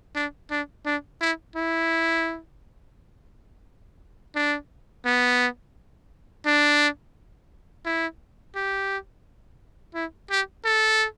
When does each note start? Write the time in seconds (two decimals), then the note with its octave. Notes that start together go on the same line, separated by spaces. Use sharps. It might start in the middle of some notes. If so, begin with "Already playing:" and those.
0.15 D4
0.51 D4
0.85 D4
1.21 E4
1.56 E4
4.35 D4
5.05 B3
6.46 D4
7.85 E4
8.55 G4
9.94 E4
10.30 G4
10.65 A4